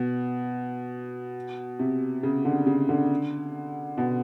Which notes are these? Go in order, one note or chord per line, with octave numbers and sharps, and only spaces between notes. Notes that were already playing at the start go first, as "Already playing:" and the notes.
Already playing: B2
C3
C#3
D3
C#3
D3
B2